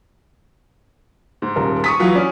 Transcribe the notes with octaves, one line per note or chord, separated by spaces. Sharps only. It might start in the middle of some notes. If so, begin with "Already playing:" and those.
G#2
D#1 A#4
C#6 D#6 B6
E3 F#3 F4
C#4 D5